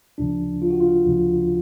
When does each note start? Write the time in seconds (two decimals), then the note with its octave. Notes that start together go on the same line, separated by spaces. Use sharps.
0.18 D2 C#3 F3 D4
0.62 F4
0.70 F#4
0.80 F4
1.06 D2 C#3 F3